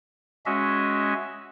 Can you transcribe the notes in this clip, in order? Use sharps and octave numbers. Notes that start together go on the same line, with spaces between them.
G#3 C#4 F#4 D#5 E5